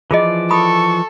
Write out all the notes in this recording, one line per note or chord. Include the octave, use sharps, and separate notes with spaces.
E3 F3 F4 G#4 D5 D#5
A4 B5 C#6 D#6